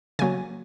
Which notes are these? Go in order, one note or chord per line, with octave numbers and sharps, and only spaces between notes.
C#3 F#3 A#3 G#5